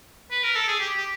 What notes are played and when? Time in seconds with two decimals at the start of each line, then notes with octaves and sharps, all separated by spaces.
0.31 B4
0.43 A#4
0.55 A4
0.68 G#4
0.80 G4
0.96 G4